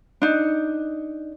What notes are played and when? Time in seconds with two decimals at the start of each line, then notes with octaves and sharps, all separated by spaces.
0.22 D4 D#4